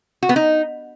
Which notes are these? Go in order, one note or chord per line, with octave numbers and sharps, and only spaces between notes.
F#4
B3
D#4